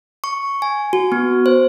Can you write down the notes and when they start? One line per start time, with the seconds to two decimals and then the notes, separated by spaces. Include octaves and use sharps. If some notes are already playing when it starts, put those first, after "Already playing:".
0.24 C#6
0.62 G#5
0.93 F#4
1.12 B3
1.46 C5